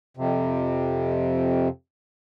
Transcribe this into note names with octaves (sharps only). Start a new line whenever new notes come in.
F2 C3